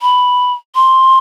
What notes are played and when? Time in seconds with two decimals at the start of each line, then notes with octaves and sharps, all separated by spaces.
0.02 B5
0.75 C6